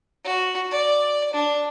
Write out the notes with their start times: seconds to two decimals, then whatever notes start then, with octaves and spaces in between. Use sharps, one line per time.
0.24 F#4
0.71 D5
1.33 D4